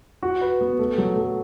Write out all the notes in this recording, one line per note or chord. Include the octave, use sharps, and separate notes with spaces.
F#4
B4
B3
A3
F#3
A3